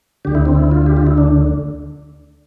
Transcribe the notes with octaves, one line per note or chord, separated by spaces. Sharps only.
D2 D3 G4
E4
C4
E4
F4
G4
F4
E4
D4